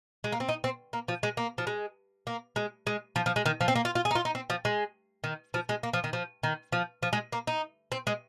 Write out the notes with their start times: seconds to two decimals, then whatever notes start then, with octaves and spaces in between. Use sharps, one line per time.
0.24 G#3
0.32 A#3
0.40 C4
0.49 D#4
0.64 C4
0.93 A#3
1.08 F3
1.23 G#3
1.37 A#3
1.58 F3
1.67 G#3
2.27 A#3
2.56 G#3
2.87 G#3
3.16 F3
3.26 F3
3.36 G#3
3.46 D#3
3.61 F3
3.68 C4
3.76 A#3
3.85 F4
3.95 F4
4.05 G#4
4.11 D#4
4.15 F4
4.25 D#4
4.35 C4
4.50 F3
4.65 G#3
5.24 D#3
5.54 F3
5.69 G#3
5.83 A#3
5.93 F3
6.04 D#3
6.13 F3
6.43 D#3
6.72 F3
7.03 F3
7.13 G#3
7.32 A#3
7.47 D#4
7.92 C4
8.07 G#3